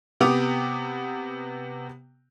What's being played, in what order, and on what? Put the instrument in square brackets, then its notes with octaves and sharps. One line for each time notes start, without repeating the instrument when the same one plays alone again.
[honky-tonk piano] C3 B3 G4 D6 D#6 F7